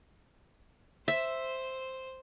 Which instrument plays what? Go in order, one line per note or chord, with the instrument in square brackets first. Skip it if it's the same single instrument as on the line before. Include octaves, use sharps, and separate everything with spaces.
[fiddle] C5 [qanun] E5